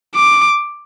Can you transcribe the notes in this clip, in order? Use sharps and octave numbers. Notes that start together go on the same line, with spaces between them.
D6